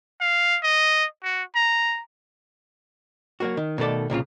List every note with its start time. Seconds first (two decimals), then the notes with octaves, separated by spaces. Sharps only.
0.21 F5
0.63 D#5
1.24 F#4
1.56 A#5
3.40 F#3 A#3 F#4
3.57 D#3
3.78 B2 D#3 A3 A4 D5
4.10 C2 A#2 C#3 F4